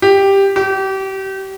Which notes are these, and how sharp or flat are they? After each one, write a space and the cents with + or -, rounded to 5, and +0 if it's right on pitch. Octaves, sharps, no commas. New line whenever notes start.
G4 +5
G4 -30